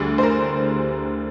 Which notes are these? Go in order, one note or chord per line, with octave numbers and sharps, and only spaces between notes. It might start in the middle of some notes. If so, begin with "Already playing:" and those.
Already playing: D2 D3 G3 G#4
C5
A#4